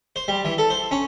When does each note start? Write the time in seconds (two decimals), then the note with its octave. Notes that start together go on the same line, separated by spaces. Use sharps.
0.16 C5
0.28 G3
0.45 E3
0.58 A4
0.70 C5
0.91 C#4